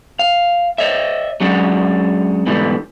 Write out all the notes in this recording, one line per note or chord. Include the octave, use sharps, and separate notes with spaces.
F5
C#5 D#5 E5
F#3 G#3 C#4 D4 F#4
G#2 B2 D3 E3 G3